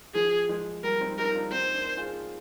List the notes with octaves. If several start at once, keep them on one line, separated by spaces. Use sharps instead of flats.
F3 G#4
F3 G#3
G3 A#3 A#4
C4 D#4
D#4 G4 A#4
D4 F4
C4 D#4 C5
A#3 D4
F4 G#4